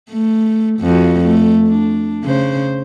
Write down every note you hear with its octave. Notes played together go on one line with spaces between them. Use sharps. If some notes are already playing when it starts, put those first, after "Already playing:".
A3
F2 F#4
A3
D4
C#3 C5